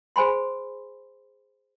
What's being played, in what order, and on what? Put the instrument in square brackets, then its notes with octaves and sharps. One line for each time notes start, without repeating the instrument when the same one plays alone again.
[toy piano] G#4 C5 G#5 B5 C6